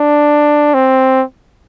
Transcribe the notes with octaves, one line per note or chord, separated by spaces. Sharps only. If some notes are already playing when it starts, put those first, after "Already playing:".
Already playing: D4
C4